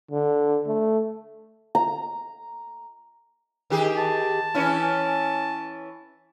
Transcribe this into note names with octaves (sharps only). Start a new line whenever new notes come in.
D3
A3
A#5
D#3 G4 G#4
A5
E3 C#4 E4